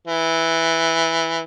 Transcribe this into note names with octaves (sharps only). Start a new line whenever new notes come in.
E3